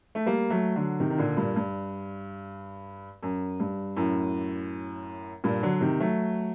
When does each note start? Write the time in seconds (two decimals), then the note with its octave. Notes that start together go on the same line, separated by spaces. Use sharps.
0.15 A3
0.26 G3 A#3
0.50 F#3 A3
0.76 D3 F#3
1.00 C3 D#3
1.10 D#3
1.18 A#2 D3
1.37 G2 A#2
1.56 G2
3.23 F#2
3.60 G2
3.96 F#2 A2
5.44 G2 A#2
5.63 D3 F#3
5.81 C3 D#3
6.00 F#3 A3